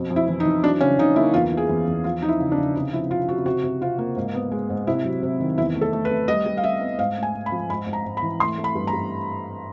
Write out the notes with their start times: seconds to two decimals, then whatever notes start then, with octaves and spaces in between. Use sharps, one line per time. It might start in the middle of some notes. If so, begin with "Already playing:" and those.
Already playing: F2 B2
0.10 F2
0.16 E4
0.29 E3
0.40 D#4
0.46 E3
0.64 F#3 D4
0.81 C#3 C#4
0.99 C#3 D#4
1.16 A#3 E4
1.34 E2 F4
1.52 E3
1.57 G#4
1.69 E2
1.87 E2
2.04 F3 F4
2.22 F3 D#4
2.28 E4
2.40 C#3
2.52 D4
2.58 C#3
2.75 C3 D#4
2.93 F3 E4
3.10 C3 F4
3.28 C3 F#4
3.46 C3 F#4
3.64 C3
3.81 C3 F4
3.98 A#3
4.16 G#2
4.34 B3
4.52 G#3
4.70 G#2
4.87 C3 E4
5.04 F#3
5.23 C3
5.40 D#3
5.58 E2 E4
5.75 A3
5.81 A4
5.93 A3
6.05 B4
6.11 A3
6.28 G3 D#5
6.46 G3
6.57 F5
6.64 G3 E5
6.81 B3
6.99 G#2 F5
7.17 A3
7.23 G#5
7.34 G#2
7.46 B5
7.52 F3
7.70 G#2 B5
7.87 G#2
7.93 A#5
8.05 G#2
8.17 B5
8.23 E3
8.40 A3 C6
8.58 A3
8.64 B5
8.75 G2
8.87 A#5
8.93 G2